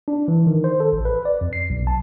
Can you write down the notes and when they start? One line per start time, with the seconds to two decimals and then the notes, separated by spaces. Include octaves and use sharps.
0.08 D4
0.28 E3
0.47 D#3
0.64 C5
0.80 A4
0.93 A1
1.05 B4
1.25 D5
1.41 F2
1.53 C7
1.70 B1
1.87 A5